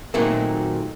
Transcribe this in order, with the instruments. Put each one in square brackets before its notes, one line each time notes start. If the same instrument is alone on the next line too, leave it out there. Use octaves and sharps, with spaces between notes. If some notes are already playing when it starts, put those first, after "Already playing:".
[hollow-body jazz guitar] A#2 D#3 F#3 G#3 A3 C4